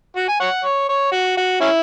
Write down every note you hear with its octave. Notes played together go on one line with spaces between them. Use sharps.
F#4
G#5
C#5 F#5
C#5
C#5
F#4
F#4
C#4 E4